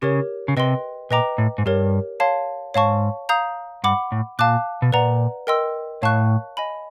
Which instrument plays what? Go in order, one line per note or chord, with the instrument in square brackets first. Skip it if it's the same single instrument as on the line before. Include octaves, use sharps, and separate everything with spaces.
[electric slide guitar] C#3 [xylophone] G4 A#4 C#5
[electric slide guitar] C#3
[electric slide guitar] C3 [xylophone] B4 D#5 G5 C6
[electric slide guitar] A#2 [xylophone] B4 D#5 G5 A#5 D6
[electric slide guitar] A2
G#2
[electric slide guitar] G2 [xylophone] G4 A#4 C#5
[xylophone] C#5 F5 A5 C6
[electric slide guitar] G#2 [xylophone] C#5 F5 A5 C#6
[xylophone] F5 A#5 D#6 G6
[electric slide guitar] G2 [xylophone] F#5 B5 D6
[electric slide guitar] A2
[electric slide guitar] A#2 [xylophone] F5 A5 D6 F#6
[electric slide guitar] B2
[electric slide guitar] A#2 [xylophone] B4 D5 F#5 A#5
[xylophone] A#4 D#5 G5 C6 E6
[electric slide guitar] A2 [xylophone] C#5 F5 A5 C#6 F#6
[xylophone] D#5 G#5 B5